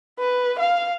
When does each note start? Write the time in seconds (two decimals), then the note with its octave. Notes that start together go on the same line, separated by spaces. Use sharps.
0.19 B4
0.59 F5